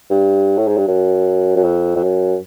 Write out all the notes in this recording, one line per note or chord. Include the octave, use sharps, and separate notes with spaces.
G2
A2
G#2
G2
F#2
F#2
F2
F2
F#2